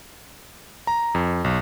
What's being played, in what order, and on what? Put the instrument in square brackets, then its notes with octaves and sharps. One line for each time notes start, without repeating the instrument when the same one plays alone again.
[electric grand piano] A#5
F2
B1